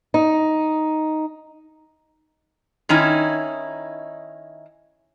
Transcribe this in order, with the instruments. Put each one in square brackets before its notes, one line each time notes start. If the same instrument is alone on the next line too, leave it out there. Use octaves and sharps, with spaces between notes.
[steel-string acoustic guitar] D#4
[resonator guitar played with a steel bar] D#3 C#4 D#4 E4